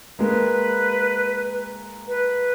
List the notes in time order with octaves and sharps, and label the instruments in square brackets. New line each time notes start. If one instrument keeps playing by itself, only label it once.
[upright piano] G#3 A#3 [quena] B4
[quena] B4